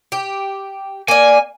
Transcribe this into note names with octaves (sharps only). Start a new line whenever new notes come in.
G4
A#3 D5 G#5